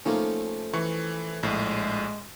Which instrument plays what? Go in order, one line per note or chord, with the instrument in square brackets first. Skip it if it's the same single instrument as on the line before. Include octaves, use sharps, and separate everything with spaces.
[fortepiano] D#3 A#3 [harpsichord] F3 A3 C#4
[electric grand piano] E3 [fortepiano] C#6
[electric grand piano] A#1 A2 [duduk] G#3